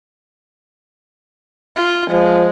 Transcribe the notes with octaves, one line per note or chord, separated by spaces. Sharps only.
F4
F3 G#3